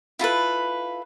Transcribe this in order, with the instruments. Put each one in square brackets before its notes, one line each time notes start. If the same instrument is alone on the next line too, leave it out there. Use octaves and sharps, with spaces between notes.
[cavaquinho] E4 F4 A4 B4